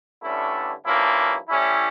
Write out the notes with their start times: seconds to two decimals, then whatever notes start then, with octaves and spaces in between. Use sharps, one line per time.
0.22 G2 D3 A3 C#4 E4
0.85 G2 F3 A#3 C#4 E4
1.49 A2 G3 C#4 E4